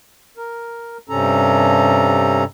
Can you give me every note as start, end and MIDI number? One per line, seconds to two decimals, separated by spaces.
0.37 0.97 70
1.09 2.44 43
1.09 2.44 48
1.09 2.44 61
1.09 2.44 69
1.09 2.44 82